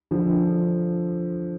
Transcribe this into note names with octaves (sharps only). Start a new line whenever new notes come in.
D3 F3